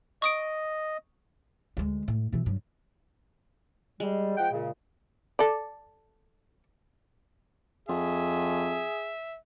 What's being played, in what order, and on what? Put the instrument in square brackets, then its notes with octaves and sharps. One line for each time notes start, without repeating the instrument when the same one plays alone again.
[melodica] D#5 [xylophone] C#6 D#6 D7
[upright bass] D2 G#3
A2
B2 E3
G2 F#3
[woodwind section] G3 [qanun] G#3
[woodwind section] F3 F#5 G5
A#2 C#3
[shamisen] A4 D5
[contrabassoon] F2 [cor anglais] G#4 [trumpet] E5